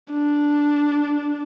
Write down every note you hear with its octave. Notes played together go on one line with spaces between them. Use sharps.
D4